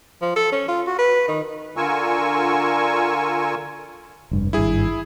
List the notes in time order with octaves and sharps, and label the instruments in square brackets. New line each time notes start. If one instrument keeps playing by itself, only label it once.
[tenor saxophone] F3
A4
C#4
F4
F#4
B4
D#3
[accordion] D3 F4 A#4 G#5 C#6 E6
[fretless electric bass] F1 G2
[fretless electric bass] G#1 G2 [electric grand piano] E4 G#4